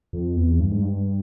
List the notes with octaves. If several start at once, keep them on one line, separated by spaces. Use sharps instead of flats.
F2
E2
G2
G#2
G2